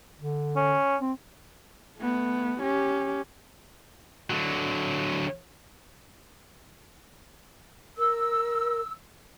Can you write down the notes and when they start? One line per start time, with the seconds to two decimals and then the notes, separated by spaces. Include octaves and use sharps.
0.19 D3
0.56 C#4
1.01 C4
1.97 A3 B3
2.60 C#4 G4
4.30 D3 F#3
7.98 A#4 E6